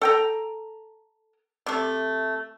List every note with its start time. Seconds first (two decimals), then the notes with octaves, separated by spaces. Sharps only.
0.01 A4 G5 A#5
1.66 C3 A3